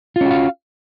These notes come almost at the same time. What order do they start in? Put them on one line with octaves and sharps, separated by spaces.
F4 C#4 F#4 F5